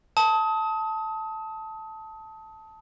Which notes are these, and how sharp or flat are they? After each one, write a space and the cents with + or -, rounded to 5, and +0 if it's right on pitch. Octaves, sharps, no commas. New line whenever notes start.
A5 +0 D#6 +30